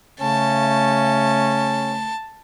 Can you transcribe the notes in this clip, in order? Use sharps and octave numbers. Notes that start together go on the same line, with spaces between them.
C#3 A3 C#4 A5